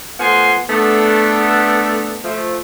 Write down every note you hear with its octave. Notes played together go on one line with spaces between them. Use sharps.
F3 A3 B3 F#5 G#5 C6
A3 B3 D4
F3 A3